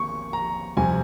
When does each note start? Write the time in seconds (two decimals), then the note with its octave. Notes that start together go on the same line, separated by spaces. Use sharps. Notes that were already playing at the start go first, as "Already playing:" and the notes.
Already playing: G#1 A#3 C#6
0.33 A#5
0.77 F2 C3 G3 G#5